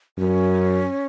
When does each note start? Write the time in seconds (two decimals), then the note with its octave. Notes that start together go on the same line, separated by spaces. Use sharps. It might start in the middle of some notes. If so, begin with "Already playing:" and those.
0.19 F#2 C#4